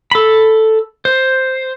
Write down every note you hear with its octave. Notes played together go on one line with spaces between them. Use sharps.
A4 B5
C5